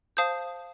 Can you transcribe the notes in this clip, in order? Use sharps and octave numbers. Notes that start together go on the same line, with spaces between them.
C5 F5 A5 D#6 G6